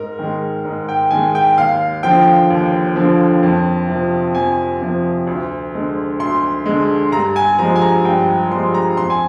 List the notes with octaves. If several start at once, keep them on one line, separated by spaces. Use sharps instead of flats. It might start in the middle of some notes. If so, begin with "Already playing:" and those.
Already playing: G#2 A#4
D#3 G#3
G#2
G5
D#3 G#3 G#5
G5
D#2 F5
D3 F3 G5
D#2
D3 F3
F2
C3 F3
F2 G#5
C3 F3
D2
D3 G#3
D2 C6
D3 G#3
G2 A#5
G#5
F3 G#3 A#5
G#5
A#5
G2 G5
F3 G#3 C6
A#5
F2 C6
G#5